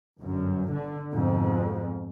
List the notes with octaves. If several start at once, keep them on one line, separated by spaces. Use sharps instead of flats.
G1 F#2
D3
F2 G#2 B2